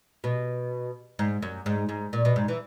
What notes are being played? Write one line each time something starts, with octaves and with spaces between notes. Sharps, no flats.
B2
G#2
F#2
G#2
G#2
A#2
B2
G#2
E3